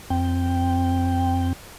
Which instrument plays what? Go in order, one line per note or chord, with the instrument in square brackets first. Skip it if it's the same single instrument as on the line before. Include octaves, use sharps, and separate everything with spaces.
[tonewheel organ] F2 C4 G5